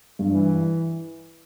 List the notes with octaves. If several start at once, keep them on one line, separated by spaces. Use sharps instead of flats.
G2
E3